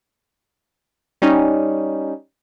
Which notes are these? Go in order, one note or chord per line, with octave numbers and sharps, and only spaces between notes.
G3 C#4 D#4